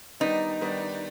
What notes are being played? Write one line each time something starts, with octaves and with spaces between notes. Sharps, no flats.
D#3 G3 B3 D4 D#4
D#3 G3 B3 D4